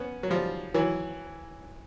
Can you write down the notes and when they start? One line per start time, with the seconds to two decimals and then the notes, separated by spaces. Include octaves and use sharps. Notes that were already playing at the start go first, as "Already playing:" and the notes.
Already playing: B3 C#4
0.23 F#3
0.30 F3 G3
0.74 E3 F#3